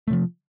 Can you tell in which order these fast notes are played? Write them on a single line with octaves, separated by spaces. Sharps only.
A3 C3 F3